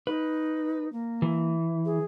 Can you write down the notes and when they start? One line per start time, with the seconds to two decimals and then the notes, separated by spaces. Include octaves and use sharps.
0.07 D#4 B4
0.92 A#3
1.22 E3
1.85 G#4